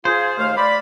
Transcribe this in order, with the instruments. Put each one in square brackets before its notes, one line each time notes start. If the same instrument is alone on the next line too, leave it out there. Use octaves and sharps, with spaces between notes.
[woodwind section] F4 G#4 [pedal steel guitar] C5
[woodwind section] D#2 A3 F5
D5 B5